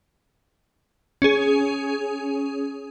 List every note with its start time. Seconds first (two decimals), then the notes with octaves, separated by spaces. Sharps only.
1.22 C#4 G#4